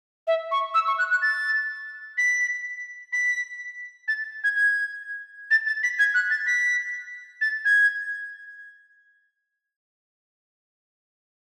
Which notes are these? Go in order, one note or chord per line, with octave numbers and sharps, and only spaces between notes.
E5
C#6
E6
C#6
F#6
F#6
A6
B6
B6
A6
G#6
G#6
A6
A6
B6
G#6
F#6
A6
B6
A6
G#6